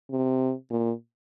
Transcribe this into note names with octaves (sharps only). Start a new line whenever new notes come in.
C3
A#2